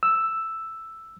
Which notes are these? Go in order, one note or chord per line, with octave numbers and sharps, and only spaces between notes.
E6